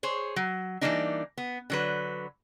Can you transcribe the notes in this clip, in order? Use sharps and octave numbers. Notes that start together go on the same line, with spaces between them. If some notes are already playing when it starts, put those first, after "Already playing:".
G#4 C5 C#5
F#3
E3 F3 G3 A#3 D4 D#4
B3
D3 F#3 B4